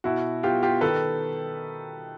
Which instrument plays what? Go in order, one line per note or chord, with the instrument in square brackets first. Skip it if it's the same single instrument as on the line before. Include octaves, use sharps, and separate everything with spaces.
[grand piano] B2 E4 F#4
B3 F4 G4
F4 G4
D#3 A4 B4